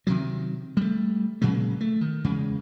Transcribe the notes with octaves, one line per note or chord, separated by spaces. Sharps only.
C3 D#3 F#3
G3 A3
A#2 C#3 F#3 G#3
A3
D#3
E2 C#3 G#3